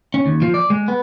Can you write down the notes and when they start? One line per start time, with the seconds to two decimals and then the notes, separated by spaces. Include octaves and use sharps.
0.14 C#4
0.26 D#2
0.42 F3
0.54 D5
0.70 G#3
0.88 B3